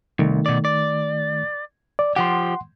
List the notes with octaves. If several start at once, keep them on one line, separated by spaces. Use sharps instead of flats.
C2 D#3 A3
B2 D5
D5
D5
F3 G4 F#5 C6